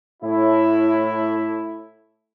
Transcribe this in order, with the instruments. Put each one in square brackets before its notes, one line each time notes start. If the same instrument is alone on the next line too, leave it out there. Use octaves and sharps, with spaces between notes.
[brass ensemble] A2 E4